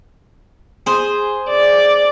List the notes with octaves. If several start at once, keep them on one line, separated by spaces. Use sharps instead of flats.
G#4 C5
D5